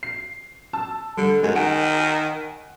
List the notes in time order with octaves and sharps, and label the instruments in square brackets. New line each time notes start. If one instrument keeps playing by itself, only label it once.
[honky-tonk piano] C7
A5 E6
[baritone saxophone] D3 [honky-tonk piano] G3
[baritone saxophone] F#2 [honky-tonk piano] G#3
[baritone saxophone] D#3 [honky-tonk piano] F#5 G#5 D7